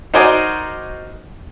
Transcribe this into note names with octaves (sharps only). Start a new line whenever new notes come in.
D#4 F#4 A#4 C5 D5 G#5